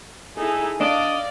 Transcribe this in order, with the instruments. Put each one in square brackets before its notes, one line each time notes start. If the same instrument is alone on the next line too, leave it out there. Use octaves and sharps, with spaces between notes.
[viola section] D#4 E4 A4 [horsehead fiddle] G#4
[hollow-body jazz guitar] D4 [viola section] D5 [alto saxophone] D#5 [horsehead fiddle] F5